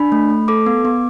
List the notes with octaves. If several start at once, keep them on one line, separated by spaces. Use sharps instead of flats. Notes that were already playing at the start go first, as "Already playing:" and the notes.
Already playing: D4 B5
A3
A3
A4 D6
B3
B3